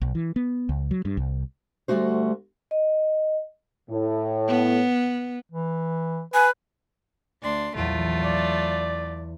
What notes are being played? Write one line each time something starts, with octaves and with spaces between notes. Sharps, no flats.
B1
E3
B3
C#2
F#3
G2
C2
D2 G2 G3 A3 F#4 C5
D#5
A2
B3
E3
B4 G#5
D2 D4 C6
A#1 E2 F#3 A3 F4
D5 A6 C7 D7